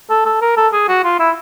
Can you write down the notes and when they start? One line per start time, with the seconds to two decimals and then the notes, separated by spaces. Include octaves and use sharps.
0.10 A4
0.26 A4
0.42 A#4
0.57 A4
0.73 G#4
0.88 F#4
1.04 F4
1.20 E4